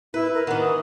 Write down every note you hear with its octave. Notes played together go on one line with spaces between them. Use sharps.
E4 B4
A#4
D#3 E3 F#5
D#6